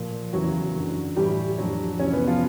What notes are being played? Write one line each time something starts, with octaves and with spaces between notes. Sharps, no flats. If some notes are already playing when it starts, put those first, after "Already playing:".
Already playing: A#2 F3
E2 C#3 E3 F#3 F#4
F#2 D3 F#3
A2 E3 G3 G4
F2 D3 F#3
F2 C3 E3 C#4 C#5
B3 B4
F3 F4